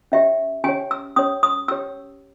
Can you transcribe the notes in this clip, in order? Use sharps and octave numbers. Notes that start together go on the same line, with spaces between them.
C#4 G4 C#5 E5
C#4 G4 C#5 G#5
E6
C#4 G4 C#5 D#6
D#6
C#4 G4 C#5 E6